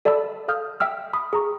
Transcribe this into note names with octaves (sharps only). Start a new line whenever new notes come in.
A4 D5 E5 A5 B5 E6
A4 F5 D#6 F6 G6
E5 G5 E6 F6
B5 D#6 B6
G#4 A#5 C#6